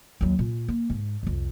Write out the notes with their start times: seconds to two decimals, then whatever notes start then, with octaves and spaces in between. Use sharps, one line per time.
0.21 D#2 F#3
0.39 A#2
0.68 A#3
0.90 G#2
1.23 C2 F2